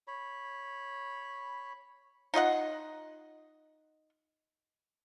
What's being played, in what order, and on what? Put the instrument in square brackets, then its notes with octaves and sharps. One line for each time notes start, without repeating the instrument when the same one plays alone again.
[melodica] C#5 B5
[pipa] D#4 F4 D#5 F#5